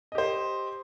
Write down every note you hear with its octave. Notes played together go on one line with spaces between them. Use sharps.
G4 C5 D#5